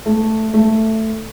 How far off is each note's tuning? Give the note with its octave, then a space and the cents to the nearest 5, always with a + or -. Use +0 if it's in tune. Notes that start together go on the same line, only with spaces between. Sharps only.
A3 +0
A3 +5